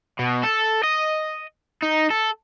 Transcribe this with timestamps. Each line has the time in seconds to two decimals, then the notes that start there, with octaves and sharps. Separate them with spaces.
0.19 B2
0.44 A4
0.83 D#5
1.83 D#4
2.11 A4